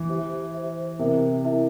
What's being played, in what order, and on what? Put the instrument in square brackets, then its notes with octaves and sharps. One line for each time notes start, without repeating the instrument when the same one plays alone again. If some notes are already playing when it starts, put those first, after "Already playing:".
Already playing: [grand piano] E3
[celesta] G4 C5 E5
G4 C5 E5
[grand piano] C3 [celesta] E4 A#4 E5
[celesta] E4 A#4 E5